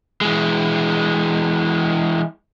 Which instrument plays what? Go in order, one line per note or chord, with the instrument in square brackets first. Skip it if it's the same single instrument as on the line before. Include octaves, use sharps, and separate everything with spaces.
[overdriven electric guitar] E3 G#3